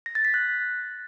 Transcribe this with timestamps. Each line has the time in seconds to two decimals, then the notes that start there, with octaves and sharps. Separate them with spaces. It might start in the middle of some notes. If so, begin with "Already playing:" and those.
0.06 A#6
0.15 A6
0.25 B6
0.34 F#6